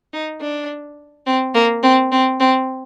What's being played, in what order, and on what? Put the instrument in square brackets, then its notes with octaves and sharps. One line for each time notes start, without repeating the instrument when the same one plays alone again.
[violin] D#4
D4
C4
A#3
C4
C4
C4